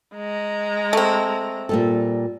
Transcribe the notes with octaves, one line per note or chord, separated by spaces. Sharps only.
G#3 A#5
A3 C4
A#2 G3 A4